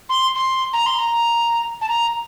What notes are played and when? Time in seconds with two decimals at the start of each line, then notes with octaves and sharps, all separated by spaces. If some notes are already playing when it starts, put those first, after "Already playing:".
0.09 C6
0.35 C6
0.73 A#5
0.86 C6
0.98 A#5
1.81 A5
1.89 A#5